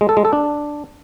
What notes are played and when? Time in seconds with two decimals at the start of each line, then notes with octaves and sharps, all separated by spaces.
0.01 G#3
0.09 A4
0.17 G#3
0.25 A4
0.33 D4